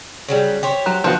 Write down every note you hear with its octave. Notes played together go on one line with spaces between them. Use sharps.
C#3 F#3 G3
G4 C5 C#5
F#3
D#3 F3 B3 F#4